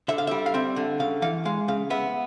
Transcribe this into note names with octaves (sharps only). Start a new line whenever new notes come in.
D3 E5
F5
G3 E5
F5
C4 E5
D3
C#3 F5
E3 F5
G#3 F5
C#3 F5
B3 E5